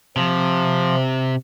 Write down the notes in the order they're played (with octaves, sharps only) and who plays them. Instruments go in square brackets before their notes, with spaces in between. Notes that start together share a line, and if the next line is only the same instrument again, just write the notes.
[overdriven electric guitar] C3 [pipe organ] F3